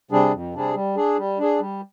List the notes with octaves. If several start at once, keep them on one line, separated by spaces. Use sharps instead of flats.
C3 G3 D4 G#4
F2
C3 G3 D4 G#4
G3
D4 G#4
G3
D4 G#4
G3